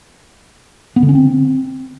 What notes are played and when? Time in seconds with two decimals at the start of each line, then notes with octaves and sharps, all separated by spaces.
0.96 B3
1.03 D3
1.09 C#4
1.15 C4